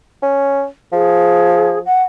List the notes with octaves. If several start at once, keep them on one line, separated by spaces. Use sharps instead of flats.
C#4
F3 G#4
F#5